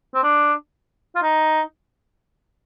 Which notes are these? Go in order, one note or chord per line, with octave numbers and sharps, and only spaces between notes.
C4
D4
F4
D#4